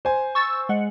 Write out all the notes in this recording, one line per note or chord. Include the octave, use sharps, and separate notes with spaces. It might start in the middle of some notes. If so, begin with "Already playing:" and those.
C5 G#5
C#6 E6 A6
G#3 F#5